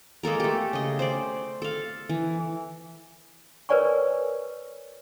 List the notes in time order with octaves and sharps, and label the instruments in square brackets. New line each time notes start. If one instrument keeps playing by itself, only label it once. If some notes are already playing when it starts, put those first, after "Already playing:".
[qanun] G#3 A#3 A4 A#4
A3 G4
C#3 D#5
C5 D5
A4 F5
E3
[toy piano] A#4 B4 C#5 D5 G#5 C#6